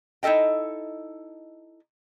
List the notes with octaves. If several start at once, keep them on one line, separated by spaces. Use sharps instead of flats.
D#4 E4 A4 D#5 G5